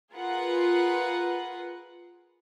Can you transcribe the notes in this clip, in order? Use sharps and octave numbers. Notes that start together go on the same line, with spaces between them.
F4 G#4 A#4 B4 F#5